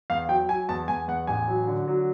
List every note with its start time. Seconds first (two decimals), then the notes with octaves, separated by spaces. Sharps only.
0.10 E2 F5
0.29 F#3 G5
0.49 F#3 G#5
0.69 E2 A5
0.88 E2 G#5
1.08 E2 F#5
1.27 A1 G#5
1.48 F#3
1.67 D3
1.88 F#3